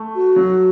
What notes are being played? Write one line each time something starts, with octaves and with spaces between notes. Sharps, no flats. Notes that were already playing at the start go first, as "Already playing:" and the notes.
Already playing: A3
F#4
F#3